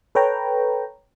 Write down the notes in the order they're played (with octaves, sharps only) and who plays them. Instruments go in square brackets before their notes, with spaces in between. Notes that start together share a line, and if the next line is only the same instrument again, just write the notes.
[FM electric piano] A4 B4 C#5 G5 A#5